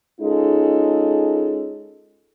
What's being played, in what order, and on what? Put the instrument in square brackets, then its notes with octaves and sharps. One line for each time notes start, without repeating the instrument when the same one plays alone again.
[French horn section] G#3 C#4 D#4 F4 G#4 A4